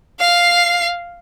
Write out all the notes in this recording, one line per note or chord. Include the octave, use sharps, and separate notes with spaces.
F5 C7